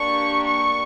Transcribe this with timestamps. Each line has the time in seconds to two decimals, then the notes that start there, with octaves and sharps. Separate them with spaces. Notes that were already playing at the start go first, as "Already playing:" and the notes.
Already playing: A#3 D4 G4 C#6
0.46 C#6